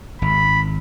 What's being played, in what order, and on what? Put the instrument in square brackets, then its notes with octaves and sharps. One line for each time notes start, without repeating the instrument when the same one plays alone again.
[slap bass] G#1 [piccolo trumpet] B5